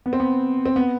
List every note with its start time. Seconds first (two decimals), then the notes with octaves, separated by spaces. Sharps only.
0.06 B3
0.13 C4
0.20 B3
0.66 C4
0.76 B3